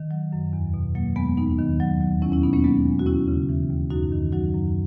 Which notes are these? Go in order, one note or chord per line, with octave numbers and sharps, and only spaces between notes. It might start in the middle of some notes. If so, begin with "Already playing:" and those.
Already playing: D#3
F#3
F#2
E2
B2
F#3 A#3
E2 G#3 B3
D#2 B3 D#4
D#3
F#3
D#2
E2 C#4 E4
C#4 E4
B2 B3 D#4
A#3 C#4
F#3 G#3 B3
E2
F#4
D#2 C#4 E4
C#3
E3
D#2
F#2 D#4 F#4
D#3
F#3 D#4 F#4
F#2